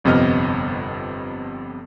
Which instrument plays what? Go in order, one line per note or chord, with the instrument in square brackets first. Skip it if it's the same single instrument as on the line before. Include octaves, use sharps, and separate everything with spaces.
[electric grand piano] G1 F2 C3 B3 D#5 F6